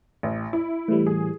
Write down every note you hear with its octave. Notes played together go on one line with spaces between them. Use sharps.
A1
E4
A2 E3 G3
G#4